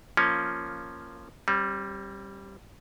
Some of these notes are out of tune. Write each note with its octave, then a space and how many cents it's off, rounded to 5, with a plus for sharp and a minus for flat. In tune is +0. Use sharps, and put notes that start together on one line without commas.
F3 -5 A#3 +0 C#4 +0
G3 +0 C4 +45